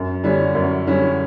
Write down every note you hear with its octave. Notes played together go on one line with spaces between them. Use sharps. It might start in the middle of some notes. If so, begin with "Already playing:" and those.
Already playing: F#2
D3 G3 C#4 E4
F#2
D3 G3 C#4 E4